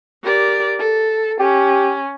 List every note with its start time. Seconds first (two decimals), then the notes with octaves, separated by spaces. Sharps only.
0.23 G4 A#4 D5
0.78 A4
1.40 C#4 G4